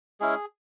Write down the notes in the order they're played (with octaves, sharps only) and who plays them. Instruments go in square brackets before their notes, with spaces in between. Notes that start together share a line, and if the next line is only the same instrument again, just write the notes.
[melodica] G#3 C#4 E4 G#4